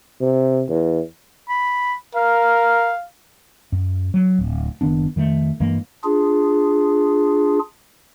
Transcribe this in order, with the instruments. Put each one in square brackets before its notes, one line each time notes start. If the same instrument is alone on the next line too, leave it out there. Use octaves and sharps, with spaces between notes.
[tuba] C3
E2
[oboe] B5
[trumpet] A#4 [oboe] F5
[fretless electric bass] F#2
F#3
D1
F#1 D#3 B3 D4
F2 D#3 F#3 A3
G2 E3 G#3 A#3
[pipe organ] D4 F4 G#4